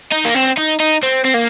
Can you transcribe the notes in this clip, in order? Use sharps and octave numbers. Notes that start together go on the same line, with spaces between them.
D#4
A#3
C4
D#4
D#4
C4
C4
A#3